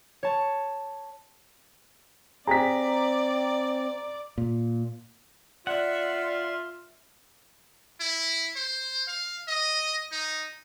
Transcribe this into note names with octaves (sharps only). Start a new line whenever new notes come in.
C#5 A5
C4 G4 G#4 D5 A#5 B6
A#2
F4 D5 E5 F#5
E4
C5
F5
D#5
D#4